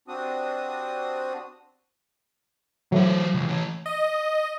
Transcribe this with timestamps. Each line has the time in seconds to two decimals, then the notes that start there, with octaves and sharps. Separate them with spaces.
0.08 C3 C4 D4 F#4 D#6
2.92 E3 F#3 A3 C5
3.34 C#2
3.46 E3 C#5
3.86 D#5